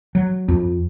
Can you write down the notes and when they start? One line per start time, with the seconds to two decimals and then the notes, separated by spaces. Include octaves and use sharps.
0.15 F#3
0.48 F2